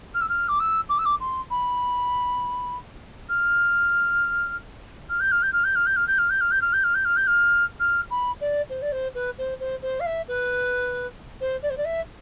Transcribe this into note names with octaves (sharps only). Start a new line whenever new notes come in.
F6
E6
F6
D6
E6
D6
E6
D6
C6
B5
F6
F6
G6
F6
G6
F6
G6
F6
G6
F6
G6
F6
G6
F6
G6
F6
G6
F6
G6
F6
G6
F6
F6
B5
D5
C5
D5
C5
B4
C5
C5
C5
F5
E5
B4
C5
D5
C5
D5
E5